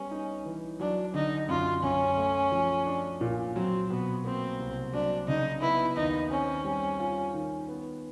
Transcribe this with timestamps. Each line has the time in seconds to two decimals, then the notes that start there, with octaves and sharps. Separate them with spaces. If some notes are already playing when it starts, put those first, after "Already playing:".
Already playing: G3 B3 C#4
0.11 D#4
0.46 E3
0.80 F#3 D4
1.14 D3 D#4
1.49 F#2 F4
1.83 F#2 C#4
2.17 A3
2.52 F3
2.86 D4
3.21 A#2
3.56 F#3 C4
3.90 B2 B3
4.24 A#3 C4
4.59 C2
4.93 F#3 D4
5.28 C#3 D#4
5.61 B3 E4
5.96 D#2 D#4
6.30 C4 C#4
6.65 G3
6.99 F4
7.34 D#3
7.69 B3